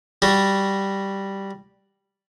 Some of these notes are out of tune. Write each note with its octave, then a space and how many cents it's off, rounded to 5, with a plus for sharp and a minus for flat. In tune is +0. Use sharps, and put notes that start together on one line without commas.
G3 +0 F#4 +10